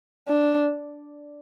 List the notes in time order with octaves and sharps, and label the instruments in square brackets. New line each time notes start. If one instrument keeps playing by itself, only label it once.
[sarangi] D4